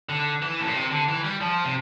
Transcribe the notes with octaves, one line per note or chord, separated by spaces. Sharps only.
D3
E3
A2
A#2
C3
D3
E3
G3
F3
C3